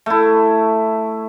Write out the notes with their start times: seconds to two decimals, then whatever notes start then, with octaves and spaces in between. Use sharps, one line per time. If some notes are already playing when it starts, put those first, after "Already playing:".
0.06 A3 E4